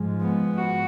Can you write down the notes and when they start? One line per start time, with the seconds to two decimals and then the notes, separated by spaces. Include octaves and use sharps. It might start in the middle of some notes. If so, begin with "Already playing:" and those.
Already playing: G#2 F3 G#3
0.22 B3
0.58 F#4